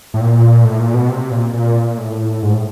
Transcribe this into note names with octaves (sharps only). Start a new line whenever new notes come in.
A2
A#2
A2
A#2
B2
C3
A#2
A#2
A2
G#2
A2